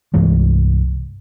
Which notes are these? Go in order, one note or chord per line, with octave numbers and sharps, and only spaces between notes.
C2 G2 E3 G#3